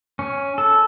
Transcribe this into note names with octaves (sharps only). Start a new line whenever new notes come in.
C#4
A4